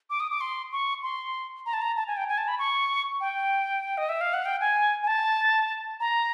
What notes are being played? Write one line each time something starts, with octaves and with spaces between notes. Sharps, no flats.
D6
D#6
D6
C6
C#6
C6
A#5
A5
A#5
A5
G#5
G5
G#5
A5
B5
C#6
G5
D#5
E5
F5
F#5
G5
G#5
G#5
A5
A#5